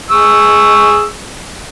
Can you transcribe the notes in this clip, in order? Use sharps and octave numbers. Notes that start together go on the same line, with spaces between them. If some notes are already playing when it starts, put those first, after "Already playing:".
G#4 C#6 E6